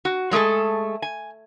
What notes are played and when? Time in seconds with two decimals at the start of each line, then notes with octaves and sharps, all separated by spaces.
0.05 F#4
0.31 F#3 G#3 A3 G#4 A4
1.02 G#5